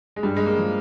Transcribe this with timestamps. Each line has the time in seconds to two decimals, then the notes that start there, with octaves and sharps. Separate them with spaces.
0.16 G#3
0.23 G2 G3
0.37 G#3
0.46 A#3
0.57 F3